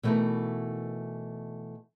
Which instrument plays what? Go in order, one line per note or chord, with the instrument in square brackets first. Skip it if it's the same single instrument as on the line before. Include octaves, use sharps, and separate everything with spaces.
[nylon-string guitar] B2 E3 A3 D#4 E4 A#4